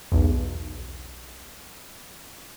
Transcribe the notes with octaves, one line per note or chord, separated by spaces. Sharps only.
B1 E2